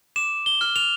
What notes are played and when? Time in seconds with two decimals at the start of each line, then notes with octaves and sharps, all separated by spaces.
0.16 D6 E7
0.46 G7
0.61 F6
0.76 F7